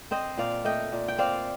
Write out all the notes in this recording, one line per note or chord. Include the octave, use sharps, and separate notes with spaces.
C4 C5 D#5
A#2 D5 F5
A3 D#5 G5
A#2
G5
C4 D5 F5